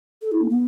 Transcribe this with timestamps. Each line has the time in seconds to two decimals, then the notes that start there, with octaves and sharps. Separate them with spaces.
0.22 A4
0.32 E4
0.41 A#3
0.50 B3